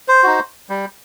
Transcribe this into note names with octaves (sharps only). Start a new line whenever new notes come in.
C5
D#4 F#4
G3